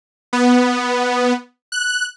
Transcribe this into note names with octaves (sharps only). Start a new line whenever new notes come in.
B3
F#6